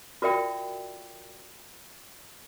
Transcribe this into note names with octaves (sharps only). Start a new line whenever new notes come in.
F4 F#4 A#4 D5 E5 G5